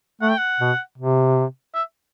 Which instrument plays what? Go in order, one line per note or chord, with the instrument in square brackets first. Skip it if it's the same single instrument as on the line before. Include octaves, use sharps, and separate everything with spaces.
[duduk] A3 [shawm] F#5
[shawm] G5
F#5
[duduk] B2
C3
[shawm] E5